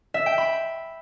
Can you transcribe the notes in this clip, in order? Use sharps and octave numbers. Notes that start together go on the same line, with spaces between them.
E5
G5
B5